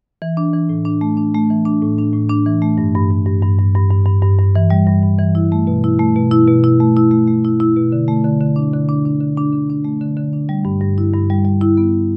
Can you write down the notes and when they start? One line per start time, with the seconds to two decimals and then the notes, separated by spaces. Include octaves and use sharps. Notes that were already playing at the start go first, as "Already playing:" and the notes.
0.22 E3
0.37 D4
0.54 E3
0.69 A2
0.85 D4
1.01 A3
1.17 D4
1.34 A3
1.50 E3
1.65 D4
1.82 A2
1.98 D4
2.13 A2
2.30 D4
2.46 E3
2.62 A3
2.78 G2
2.95 G2
3.11 G2
3.26 G2
3.43 G2
3.59 G2
3.75 G2
3.91 G2
4.06 G2
4.23 G2
4.39 G2
4.56 E3
4.70 G3
4.87 G2
5.03 G2
5.19 E3
5.35 E4
5.52 A3
5.67 B2
5.84 E4
5.99 A3
6.16 B2
6.31 E4
6.47 B2
6.64 E4
6.80 A3
6.97 E4
7.11 A3
7.27 A3
7.45 E4
7.60 E4
7.76 B2
7.92 D3
8.08 A3
8.24 D3
8.41 D3
8.56 D4
8.73 D3
8.89 D4
9.05 D4
9.20 D3
9.37 D4
9.52 D3
9.70 D4
9.84 A3
10.01 D3
10.17 D3
10.33 D4
10.49 G3
10.65 G2
10.81 G2
10.98 E4
11.14 G2
11.30 G3
11.45 G3
11.61 E4
11.77 B3